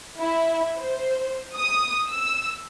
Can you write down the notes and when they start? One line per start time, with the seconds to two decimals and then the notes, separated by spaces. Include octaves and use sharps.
0.19 E4
0.79 C5
1.57 D#6
2.10 E6